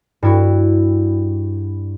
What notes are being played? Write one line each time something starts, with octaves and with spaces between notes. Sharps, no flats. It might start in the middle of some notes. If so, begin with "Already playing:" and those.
G2 E4 F#4